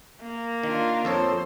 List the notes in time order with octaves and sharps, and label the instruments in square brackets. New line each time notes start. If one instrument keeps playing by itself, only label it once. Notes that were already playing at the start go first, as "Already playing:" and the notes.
[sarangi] A#3
[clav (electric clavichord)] D#3 [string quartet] D4 F4
[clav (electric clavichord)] F2 A4 C#5 [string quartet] C5